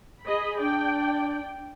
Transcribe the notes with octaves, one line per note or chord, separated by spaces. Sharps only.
G#4 D#5 B5
D4 D5 G5